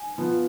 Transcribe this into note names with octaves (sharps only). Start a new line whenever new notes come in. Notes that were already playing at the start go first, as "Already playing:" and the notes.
Already playing: G#5
F3 B3 F4